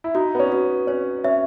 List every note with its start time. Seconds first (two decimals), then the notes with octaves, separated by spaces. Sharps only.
0.04 E4
0.15 D#4 F#4
0.35 B3
0.39 C#4
0.52 F#4
0.87 C#4 C#5
1.24 C#4 E5